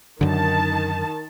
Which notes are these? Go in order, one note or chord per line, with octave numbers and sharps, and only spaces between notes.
F#2 D3 D#3 A5